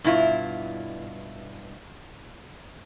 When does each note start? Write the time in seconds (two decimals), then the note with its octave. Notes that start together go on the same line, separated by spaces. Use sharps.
0.04 G2 B2 E4 F4